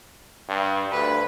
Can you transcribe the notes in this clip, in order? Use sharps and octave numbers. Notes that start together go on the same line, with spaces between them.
G2
D2 B4